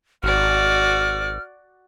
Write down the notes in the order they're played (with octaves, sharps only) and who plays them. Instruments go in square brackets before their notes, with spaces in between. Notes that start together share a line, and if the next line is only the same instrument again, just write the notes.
[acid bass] G#1 [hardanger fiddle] F#4 D5 [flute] F6